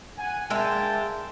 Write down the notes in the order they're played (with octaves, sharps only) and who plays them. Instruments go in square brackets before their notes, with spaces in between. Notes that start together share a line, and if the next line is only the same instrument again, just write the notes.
[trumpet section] F#5 G#5
[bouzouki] G#3 A#3 E5 [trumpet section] D4 G5 A5